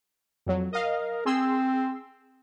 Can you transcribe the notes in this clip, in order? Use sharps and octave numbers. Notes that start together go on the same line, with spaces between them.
F2 F#3
A#4 D#5 F5
C4 G#4 C6 E6